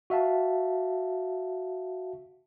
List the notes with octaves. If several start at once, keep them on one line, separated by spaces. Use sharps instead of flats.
F#4 E5 F5 A5